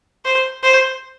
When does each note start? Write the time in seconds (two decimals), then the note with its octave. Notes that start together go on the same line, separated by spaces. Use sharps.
0.25 C5
0.63 C5